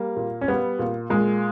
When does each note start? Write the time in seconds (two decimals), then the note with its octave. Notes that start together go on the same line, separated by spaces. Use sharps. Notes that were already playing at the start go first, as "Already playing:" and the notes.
Already playing: G3 A#3
0.16 A#2
0.41 C#4
0.48 G3 B3
0.79 A#2
1.10 A#2 G#3